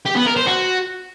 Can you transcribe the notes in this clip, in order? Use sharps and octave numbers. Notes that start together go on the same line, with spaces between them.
G4
B3
A#4
C5
F#4